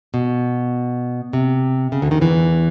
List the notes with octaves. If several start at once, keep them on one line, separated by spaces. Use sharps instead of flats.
B2
C3
C#3
D2 D3
D#2 D#3
E2 E3